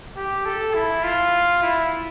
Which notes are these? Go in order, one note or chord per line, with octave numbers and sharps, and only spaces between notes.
G4
A4
E4
F4
E4